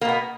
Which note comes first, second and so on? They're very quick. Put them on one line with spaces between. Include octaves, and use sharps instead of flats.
A#3 B2 B3